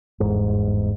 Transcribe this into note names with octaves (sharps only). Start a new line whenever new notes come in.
G1 E2 G#2